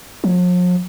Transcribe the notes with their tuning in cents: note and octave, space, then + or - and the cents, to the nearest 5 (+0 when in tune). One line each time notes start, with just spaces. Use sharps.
F3 +45